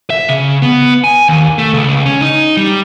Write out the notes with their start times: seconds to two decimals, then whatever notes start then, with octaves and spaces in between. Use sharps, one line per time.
0.10 E5
0.29 C#3
0.62 B3
1.04 G#5
1.29 D#2
1.58 A3
1.74 C#2
2.06 C#4
2.22 D#4
2.57 G3